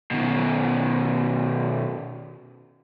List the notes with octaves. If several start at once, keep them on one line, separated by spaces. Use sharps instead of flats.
B2 D#3